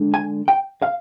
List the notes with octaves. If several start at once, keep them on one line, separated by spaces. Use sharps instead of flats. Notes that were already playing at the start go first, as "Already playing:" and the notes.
Already playing: D3 G#3 D4
G#5
G5
F5